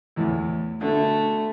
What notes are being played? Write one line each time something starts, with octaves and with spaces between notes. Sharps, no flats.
E2 A2 E4
B2 D3 A3